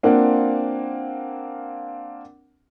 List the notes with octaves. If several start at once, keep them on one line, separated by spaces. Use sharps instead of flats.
A#3 C4 D4 F4 A#4 F#5